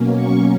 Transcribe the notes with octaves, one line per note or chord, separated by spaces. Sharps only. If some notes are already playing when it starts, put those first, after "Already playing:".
Already playing: B2 F#3 A#3 C#4
C#6